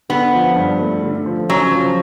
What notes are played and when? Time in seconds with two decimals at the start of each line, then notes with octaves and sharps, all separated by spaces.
0.09 D3 B3
0.33 F3
0.56 G2
0.79 A3
1.03 D3
1.26 F3
1.49 C#3 F#3
1.72 F3